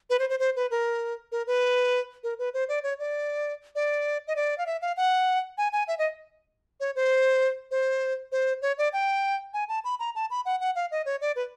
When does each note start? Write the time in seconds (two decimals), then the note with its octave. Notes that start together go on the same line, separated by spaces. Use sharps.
0.10 B4
0.19 C5
0.30 C5
0.40 C5
0.56 B4
0.71 A#4
1.32 A#4
1.47 B4
2.23 A#4
2.39 B4
2.54 C5
2.69 D5
2.83 C#5
2.99 D5
3.75 D5
4.28 D#5
4.36 D5
4.58 F5
4.66 E5
4.82 F5
4.97 F#5
5.58 G#5
5.73 G#5
5.88 E5
5.99 D#5
6.80 C#5
6.95 C5
7.71 C5
8.32 C5
8.62 C#5
8.78 D5
8.93 G5
9.54 G#5
9.69 A5
9.84 B5
10.00 A#5
10.15 A5
10.30 B5
10.45 F#5
10.60 F#5
10.75 F5
10.91 D#5
11.06 C#5
11.21 D5
11.36 B4